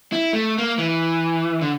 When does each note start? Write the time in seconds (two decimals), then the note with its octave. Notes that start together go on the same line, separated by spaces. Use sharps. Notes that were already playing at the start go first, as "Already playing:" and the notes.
0.13 E4
0.33 A3
0.58 A#3
0.78 E3
1.61 D3